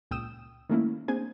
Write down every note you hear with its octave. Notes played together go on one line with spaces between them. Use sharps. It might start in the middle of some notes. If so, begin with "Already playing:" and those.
C#2 A#2 G5 D#6 E6 E7
D#3 G3 A3 A#3 C#4 E4
A#3 C4 D4 G#4 C5 G#5